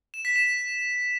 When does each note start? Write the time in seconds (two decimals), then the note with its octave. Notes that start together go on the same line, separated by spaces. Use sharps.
0.14 E7
0.25 B6
0.36 E7